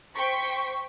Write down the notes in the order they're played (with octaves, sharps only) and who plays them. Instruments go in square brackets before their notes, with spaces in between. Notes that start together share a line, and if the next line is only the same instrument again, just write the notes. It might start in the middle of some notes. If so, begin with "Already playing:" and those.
[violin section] C5 G5 C#6 B6